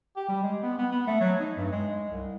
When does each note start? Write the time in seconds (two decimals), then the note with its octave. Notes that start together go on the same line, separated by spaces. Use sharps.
0.17 G4
0.28 G3
0.43 G#3
0.63 B3
0.78 B3
0.92 B3
1.07 A3
1.21 F#3
1.39 D#4
1.56 G2
1.72 G#3
2.10 C2